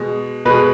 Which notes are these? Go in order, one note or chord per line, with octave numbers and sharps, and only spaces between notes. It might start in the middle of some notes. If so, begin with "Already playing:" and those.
Already playing: B2 G#3
B2 G#3 B4